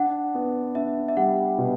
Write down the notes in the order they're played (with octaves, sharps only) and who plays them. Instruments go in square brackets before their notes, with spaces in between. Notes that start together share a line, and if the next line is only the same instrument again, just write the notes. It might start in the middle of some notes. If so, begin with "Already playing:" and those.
Already playing: [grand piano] D4 [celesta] F#5
[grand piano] B3
[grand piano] D4 [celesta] E5
[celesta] E5
[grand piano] G3 [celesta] F#5
[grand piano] B2